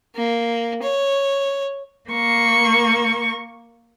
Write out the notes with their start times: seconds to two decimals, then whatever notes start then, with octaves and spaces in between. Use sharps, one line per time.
0.16 A#3
0.82 C#5
2.10 A#3 C#6